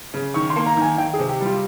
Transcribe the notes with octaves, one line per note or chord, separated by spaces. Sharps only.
C#3
D#3 C#6
C6
A#3
A#5
D#3
G#5
D#3 G5
G#4
C3
G4
G3
F4